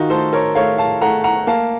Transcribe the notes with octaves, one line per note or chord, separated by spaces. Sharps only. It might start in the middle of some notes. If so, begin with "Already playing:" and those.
Already playing: D#3 D#4 F4 F#4
A3 A4 C5
A#4 C#5
A3 C#5 F5
F5 A5
A3 F#5 A#5
F#5 A#5
A#3 F5 A5